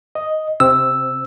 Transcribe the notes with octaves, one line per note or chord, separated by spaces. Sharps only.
D#5
C3 C4 E6